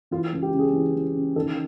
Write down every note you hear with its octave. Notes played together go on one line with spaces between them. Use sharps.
E3 F4
C#2
G4
C#3
G#4
E3
E3
C#3
D#3 A4